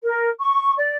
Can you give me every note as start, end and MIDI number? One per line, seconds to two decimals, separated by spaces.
0.04 0.27 70
0.39 0.74 85
0.77 0.95 74